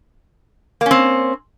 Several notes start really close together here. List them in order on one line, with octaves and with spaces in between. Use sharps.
A#3 C#4 C4